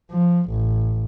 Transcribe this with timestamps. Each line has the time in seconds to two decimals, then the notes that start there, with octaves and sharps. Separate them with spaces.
0.11 F3
0.50 A1